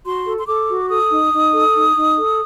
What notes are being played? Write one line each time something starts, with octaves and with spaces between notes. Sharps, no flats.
F#4 C6
A4
C6
A4 D6
F#4
A4 D#6
D#4
D#4
A4
D#4
D#4
A4